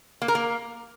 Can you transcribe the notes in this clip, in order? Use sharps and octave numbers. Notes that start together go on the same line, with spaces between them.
A#3
A#4
A#3